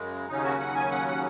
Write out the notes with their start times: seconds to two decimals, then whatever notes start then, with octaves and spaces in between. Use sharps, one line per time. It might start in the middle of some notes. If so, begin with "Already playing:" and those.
Already playing: F#2 C#3 G#3
0.28 D#2 C#3 F#3 C#4 D#4
0.43 F#4
0.60 F#5
0.75 G#5
0.91 F#5
1.07 F#5